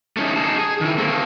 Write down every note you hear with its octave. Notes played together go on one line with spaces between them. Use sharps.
A3 C#4 D#4
D3 D#4 G#4 A5
G#4
D#3 E4
A3 A#3 C4